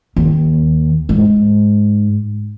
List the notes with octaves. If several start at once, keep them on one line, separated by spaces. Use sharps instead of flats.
D#2
G#2